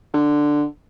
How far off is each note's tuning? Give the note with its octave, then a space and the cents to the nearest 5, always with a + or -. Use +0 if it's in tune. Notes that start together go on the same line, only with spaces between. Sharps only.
D3 +5